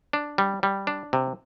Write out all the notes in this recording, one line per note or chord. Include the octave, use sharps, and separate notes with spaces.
D4
G3
G3
D4
C3